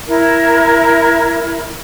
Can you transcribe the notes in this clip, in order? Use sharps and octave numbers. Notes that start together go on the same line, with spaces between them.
E4 A#4